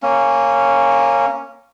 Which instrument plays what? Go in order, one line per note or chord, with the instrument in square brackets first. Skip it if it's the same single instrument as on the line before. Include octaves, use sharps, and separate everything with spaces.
[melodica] A#3 C#4